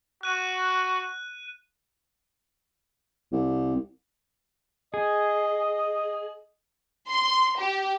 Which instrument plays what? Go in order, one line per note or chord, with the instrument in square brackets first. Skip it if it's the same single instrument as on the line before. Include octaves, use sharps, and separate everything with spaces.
[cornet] F#4 [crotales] F#6 D#7
[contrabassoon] C2
[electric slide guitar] G#4 [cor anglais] D#5
[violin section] C6
G4